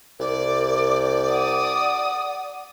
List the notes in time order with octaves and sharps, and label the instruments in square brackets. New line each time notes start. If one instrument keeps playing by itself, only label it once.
[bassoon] C2 [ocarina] A#4 [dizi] D5
[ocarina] F#5 [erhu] D#6